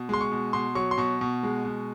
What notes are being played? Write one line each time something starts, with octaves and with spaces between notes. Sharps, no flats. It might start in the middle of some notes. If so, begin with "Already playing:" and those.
Already playing: B2
G#3 C6
C#6
B2
B2 C6
F#3 C#6
C6
B2 C#6
B2
G#3
B2